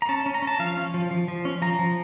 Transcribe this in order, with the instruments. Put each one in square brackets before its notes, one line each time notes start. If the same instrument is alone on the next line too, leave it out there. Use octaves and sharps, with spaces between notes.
[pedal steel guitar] A#5
C#4 A5
C#4
A#5
C#4
A5
F3 F5
C#4
F3
F3
F3
C#4
F3 A#5
F3